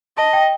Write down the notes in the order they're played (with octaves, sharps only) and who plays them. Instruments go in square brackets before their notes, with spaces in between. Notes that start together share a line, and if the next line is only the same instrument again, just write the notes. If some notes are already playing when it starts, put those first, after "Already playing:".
[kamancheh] D#5 [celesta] A5
[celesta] G5